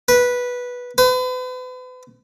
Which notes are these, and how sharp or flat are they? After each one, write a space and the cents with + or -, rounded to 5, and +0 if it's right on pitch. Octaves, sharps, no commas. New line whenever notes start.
B4 -10
B4 +40